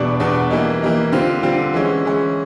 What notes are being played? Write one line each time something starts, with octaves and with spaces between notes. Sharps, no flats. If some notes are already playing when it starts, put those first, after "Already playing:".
Already playing: E2 B2 G3 B3 D4
E2 B2 G3 B3 D4
E3 G3 A#3 D#4
E3 G3 A#3 D#4
D3 G3 C4 F4
D3 G3 C4 F4
E3 G#3 C#4
E3 G#3 C#4